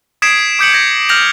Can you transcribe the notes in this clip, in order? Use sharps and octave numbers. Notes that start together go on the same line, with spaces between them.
D#6 G#6 B6 C7 D7 E7
D6 D#6 G6 B6 C#7 F#7
G#6 A#6
F6 G6 A#6 F7 F#7